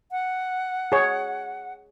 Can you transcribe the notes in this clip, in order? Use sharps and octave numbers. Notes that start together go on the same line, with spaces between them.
F#5
G#4 C#5